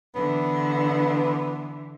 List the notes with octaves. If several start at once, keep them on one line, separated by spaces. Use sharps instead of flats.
D3 E3 B3